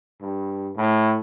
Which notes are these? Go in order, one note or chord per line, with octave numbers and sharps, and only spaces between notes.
G2
A2